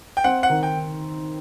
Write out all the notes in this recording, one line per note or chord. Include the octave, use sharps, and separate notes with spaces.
G5
C4 F#5
F#5
D#3
G5